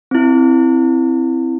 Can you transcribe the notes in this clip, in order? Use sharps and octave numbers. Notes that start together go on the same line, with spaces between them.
C4 E4